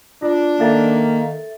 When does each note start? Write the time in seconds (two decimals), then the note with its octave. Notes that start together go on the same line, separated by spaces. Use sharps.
0.22 D4 F4
0.60 D#3 A#3 A4 E5 A6